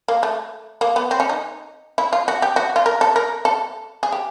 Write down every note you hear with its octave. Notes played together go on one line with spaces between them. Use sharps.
A#3
A3
A#3
B3
C4
C#4
D#4
E4
F4
F#4
G4
F#4
F4
A#4
A4
A#4
A4
G#4
G4